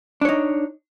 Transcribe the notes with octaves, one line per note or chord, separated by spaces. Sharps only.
D4 D#4 C#5